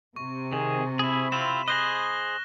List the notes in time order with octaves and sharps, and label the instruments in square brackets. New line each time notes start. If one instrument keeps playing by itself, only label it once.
[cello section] C3 [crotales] C#6
[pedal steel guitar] D#3 [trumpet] G#4
[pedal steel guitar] E4 G#4 [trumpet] B5
[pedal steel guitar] C4 E4 F4 [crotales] E7
[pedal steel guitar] G#4 C5 D#5 [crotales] F#6 A#6 G7